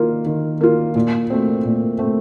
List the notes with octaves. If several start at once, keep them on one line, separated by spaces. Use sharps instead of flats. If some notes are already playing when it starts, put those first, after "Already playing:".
Already playing: D#3 A#3 F4
D#3
A#3 F4
A#2
A3 C4
A#2
A3 C4